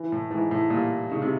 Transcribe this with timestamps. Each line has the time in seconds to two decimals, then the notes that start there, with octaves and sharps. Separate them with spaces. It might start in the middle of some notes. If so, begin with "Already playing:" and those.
Already playing: E3
0.12 A2
0.31 G#2 E3
0.51 A2
0.70 A#2 G3
1.09 C#3 D#4
1.22 C3